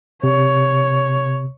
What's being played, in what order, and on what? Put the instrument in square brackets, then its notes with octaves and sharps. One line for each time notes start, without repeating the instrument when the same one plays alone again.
[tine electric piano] C3 [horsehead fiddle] C#5